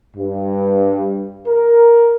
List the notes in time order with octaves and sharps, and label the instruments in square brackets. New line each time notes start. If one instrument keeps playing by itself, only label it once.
[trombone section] G2
A#4